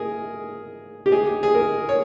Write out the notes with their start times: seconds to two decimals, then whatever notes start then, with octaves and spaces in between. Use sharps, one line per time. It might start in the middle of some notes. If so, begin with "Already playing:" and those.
Already playing: G#4 A#4
1.06 G4
1.12 G#4
1.43 G#4
1.55 A#4
1.89 C#5